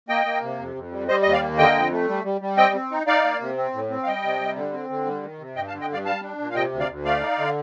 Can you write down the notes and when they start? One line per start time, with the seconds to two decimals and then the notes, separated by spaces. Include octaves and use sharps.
0.09 A#3 D#5 G5
0.25 A#3
0.42 C3
0.59 F2
0.75 F2
0.92 G3
1.08 G3 C5 D#5
1.22 D#2 D#5
1.33 D5 F5
1.41 A#3
1.58 D3 D#5 G5
1.75 F2
1.91 A3
2.08 G3
2.24 G3
2.41 G3
2.57 C4 D#5 G5
2.74 C4
2.91 D#4
3.07 D#4 D5 F5
3.24 A#3
3.40 C3
3.57 C4
3.73 A2
3.90 C4
4.03 F5
4.07 G3 D#5 G5
4.23 C3
4.40 G3
4.56 D3
4.73 C4
4.89 D3
5.06 G3
5.23 D#3
5.39 C3
5.56 G2 D#5 G5
5.68 F5 A5
5.73 D3
5.81 D#5 G5
5.89 G2 D5 F5
6.06 G3 F5 A5
6.22 D4
6.39 A#2
6.49 F5
6.55 C3 D#5 G5
6.72 D2
6.80 D5 F5
6.88 D2
7.05 A3 D5 F5
7.21 D#4
7.38 D3